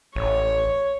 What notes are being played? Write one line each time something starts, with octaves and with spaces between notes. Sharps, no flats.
A1 C#5